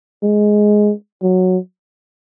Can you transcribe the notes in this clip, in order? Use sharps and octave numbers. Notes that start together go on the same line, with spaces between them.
G#3
F#3